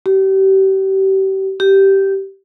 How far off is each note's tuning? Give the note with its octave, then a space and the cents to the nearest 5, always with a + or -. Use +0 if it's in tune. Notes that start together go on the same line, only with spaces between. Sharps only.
G4 -30
G4 -10